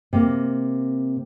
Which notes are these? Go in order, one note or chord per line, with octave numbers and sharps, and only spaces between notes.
C3 A#3